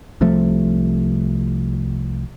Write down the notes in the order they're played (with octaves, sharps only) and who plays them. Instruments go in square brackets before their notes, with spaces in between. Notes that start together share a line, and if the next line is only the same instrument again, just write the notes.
[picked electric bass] C2 C3 F3 A3